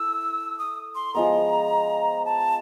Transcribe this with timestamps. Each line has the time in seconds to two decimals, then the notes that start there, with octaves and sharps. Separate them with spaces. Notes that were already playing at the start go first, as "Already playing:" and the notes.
Already playing: E4 A4 E6
0.59 D#6
0.95 C6
1.14 F3 G#3 B3 A#5
2.25 A5